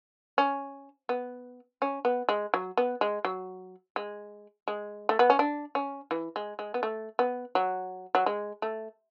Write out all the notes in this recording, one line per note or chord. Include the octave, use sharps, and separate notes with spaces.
C#4
B3
C#4
B3
G#3
F#3
B3
G#3
F#3
G#3
G#3
A3
B3
C#4
D4
C#4
E3
G#3
G#3
B3
A3
B3
F#3
F#3
G#3
A3